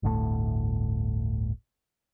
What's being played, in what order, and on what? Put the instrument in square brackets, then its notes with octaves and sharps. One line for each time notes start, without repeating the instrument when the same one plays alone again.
[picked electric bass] G1 D2 A2 A3